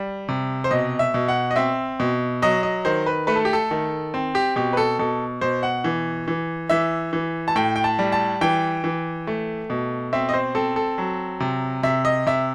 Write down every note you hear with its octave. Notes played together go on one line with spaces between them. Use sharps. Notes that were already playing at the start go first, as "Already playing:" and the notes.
Already playing: G3
C3
C5
B2 D#5
E5
B2
F#5
D#5
C4 E5
B2
F#3 D#5
D#5
D#3 C5
B4
A3 B4
A4
G4
A4
D#3
C4
G4
B2 G4
B4
A4
B2 A4
B2 C5
F#5
E3
E3
E3 E5
E3
A5
A2 G5
G5
A5
G3
A5
E3 G5
E3
A3
B2
C4 E5
D#5
C5
C4 A4
A4
F#3
C3
C3 E5
D#5
C3 E5